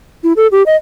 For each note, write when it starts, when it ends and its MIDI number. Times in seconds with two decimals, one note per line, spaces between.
0.24 0.33 64
0.36 0.47 69
0.52 0.63 67
0.66 0.76 75